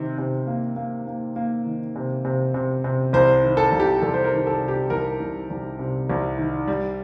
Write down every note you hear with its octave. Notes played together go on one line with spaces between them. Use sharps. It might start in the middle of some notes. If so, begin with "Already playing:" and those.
Already playing: C3 D#3
C3
A#3
A#3
A#3
A#3
D#3
C3
C3
C3
C3
C2 C5
D#3
A4
C2
G4
C2 A4
C5
A#4
D#3
A4
C3
G4
C2 A#4
C2
C2
C3
C2
D#3
G3